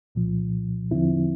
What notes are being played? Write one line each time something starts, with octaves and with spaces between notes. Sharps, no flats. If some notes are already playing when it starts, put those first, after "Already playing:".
C2 A#2 F3
E2 D3 F3 C4 E4